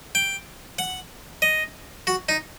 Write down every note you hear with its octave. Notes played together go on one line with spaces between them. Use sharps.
G5
F#5
D#5
F#4
D#4